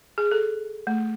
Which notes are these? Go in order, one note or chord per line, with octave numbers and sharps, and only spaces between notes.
G#4
A4
A3